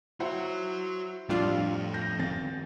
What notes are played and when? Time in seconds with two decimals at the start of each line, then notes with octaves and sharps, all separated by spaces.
0.20 E4 F#4 C5 C#5 F#5
1.29 F2 A2 G3 D4 F4
1.94 G6 A#6
2.19 D#3 C4 A6